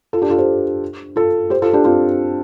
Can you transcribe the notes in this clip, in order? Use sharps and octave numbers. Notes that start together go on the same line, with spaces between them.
F4 A4
D4 G4
F4 A4
G4 C5
F4 A4
G4 C5
F4 A4
D4 G4
C4 F4